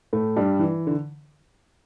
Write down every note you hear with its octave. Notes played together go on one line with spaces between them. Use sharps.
A2 A3
G2 G3
E3
D3